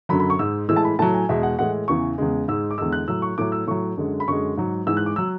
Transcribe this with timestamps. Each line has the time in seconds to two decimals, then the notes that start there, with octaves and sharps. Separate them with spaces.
0.09 F#2 D3 F#3 B5
0.20 B5
0.30 C#6
0.39 G#2 G#3 E6
0.68 A2 E3 G#3 E6
0.76 A5
0.85 B5
0.99 A2 F#3 A5
1.14 G#5
1.29 E2 B2 G#3 E5
1.43 F#5
1.59 A2 E3 G#3 F#5
1.88 E2 C#3 E3 C#6
2.18 E2 C#3 G#3
2.48 G#2 G#3 E6
2.71 D6
2.78 E2 D3 G#3 E6
2.92 F#6
3.08 A2 F#3 E6
3.22 C#6
3.38 A2 F#3 D6
3.52 E6
3.67 A2 F#3 C#6
3.97 F#2 D3 G#3
4.20 B5
4.28 F#2 D3 G#3 C#6
4.57 G#2 F#3
4.86 G#2 E3 G#3 E6
4.97 F#6
5.06 D6
5.16 F#3 E6